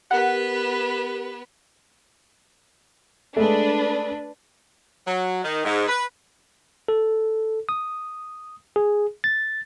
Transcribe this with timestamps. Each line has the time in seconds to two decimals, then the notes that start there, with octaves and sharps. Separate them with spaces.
0.11 B3 G4 A#4 B4 F#5
3.36 G#3 A3 D4 B4
5.06 F#3
5.44 D#3
5.64 G#2
5.88 B4
6.88 A4
7.69 D#6
8.76 G#4
9.24 A6